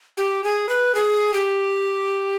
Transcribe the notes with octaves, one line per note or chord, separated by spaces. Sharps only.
G4
G#4
B4
G#4
G4